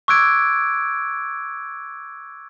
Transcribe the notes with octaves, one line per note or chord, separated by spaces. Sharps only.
C#6 D6 E6 F#6 G#6 D7